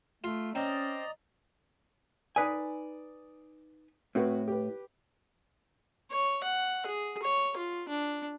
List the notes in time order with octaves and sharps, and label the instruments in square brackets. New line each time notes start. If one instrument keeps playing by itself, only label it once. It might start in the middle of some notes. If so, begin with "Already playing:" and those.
[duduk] A3 [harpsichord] F4
[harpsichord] C4 [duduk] C#4 [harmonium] D5 D#5 A#5
[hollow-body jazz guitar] D#4 B4 G#5 [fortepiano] D5 D#6
[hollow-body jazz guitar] A2 [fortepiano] C4 F#4 B4
[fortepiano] G4 B4
[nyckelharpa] C#5
F#5
G#4
C#5
F4
D4